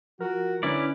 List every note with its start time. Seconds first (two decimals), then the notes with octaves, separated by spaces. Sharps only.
0.20 F3 F#4 A#4
0.63 D3 C#4 E4 B4 D5